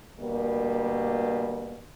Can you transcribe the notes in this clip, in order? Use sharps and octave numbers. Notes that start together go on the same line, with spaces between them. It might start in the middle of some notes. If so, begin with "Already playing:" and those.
D2 B2 G3 A#3